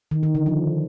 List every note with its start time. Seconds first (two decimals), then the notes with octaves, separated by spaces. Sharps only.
0.11 D#3
0.23 D#3
0.35 D3
0.46 F3